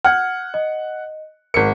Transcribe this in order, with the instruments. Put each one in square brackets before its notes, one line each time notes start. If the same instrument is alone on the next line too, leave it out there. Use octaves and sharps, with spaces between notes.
[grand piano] F#5 [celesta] F6 G#6
[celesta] D#5
[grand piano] G#1 C#7 [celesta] A#4